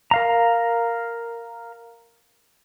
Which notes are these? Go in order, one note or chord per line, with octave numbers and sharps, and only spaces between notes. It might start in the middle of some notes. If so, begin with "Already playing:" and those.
A#4 F5 A#5